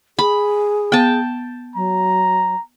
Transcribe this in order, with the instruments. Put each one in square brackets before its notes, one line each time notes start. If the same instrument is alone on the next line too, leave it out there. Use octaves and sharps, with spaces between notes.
[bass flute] G#4 [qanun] B5
[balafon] B3 [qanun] G5 A5
[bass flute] F#3 [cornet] A#5